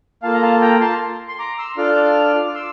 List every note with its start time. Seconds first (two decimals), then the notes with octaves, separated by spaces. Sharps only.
0.23 A#3 F4 A4 F5 A5
0.34 A#5
0.42 F5 A5
0.62 G5 A#5
0.81 A5 C6
1.28 C6
1.39 A#5 D6
1.58 C6 E6
1.77 D4 F4 A4 D6 F6
2.46 D6
2.55 C6 E6